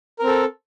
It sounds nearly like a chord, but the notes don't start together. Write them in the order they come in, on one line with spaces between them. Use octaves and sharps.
A#4 C4 A4